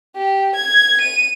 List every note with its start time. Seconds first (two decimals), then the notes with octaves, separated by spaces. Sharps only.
0.17 G4
0.55 G#6
1.01 D#7